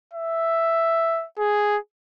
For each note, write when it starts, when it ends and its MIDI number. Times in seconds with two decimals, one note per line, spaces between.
0.13 1.26 76
1.39 1.78 68